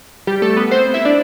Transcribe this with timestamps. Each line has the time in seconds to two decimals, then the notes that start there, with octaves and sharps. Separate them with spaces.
0.27 G3 G4
0.42 A3 A4
0.57 B3 B4
0.71 C4 C5
0.94 E4 E5
1.05 D4 D5